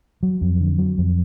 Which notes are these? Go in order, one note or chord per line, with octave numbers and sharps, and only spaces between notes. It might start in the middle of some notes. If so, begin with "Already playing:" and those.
F#3
F2
D3
F#3
F2